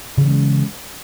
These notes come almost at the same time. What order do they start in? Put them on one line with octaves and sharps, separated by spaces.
C#3 E3 C#4 G#3